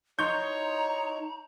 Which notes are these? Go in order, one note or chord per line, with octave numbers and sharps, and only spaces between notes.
D#4 E4 F#4 C#5 A#5 C6 C#6 G6